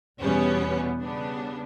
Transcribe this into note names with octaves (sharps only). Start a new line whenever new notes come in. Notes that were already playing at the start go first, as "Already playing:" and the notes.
E2 B2 G3 B3 C#4
C#3 G3 B3 D4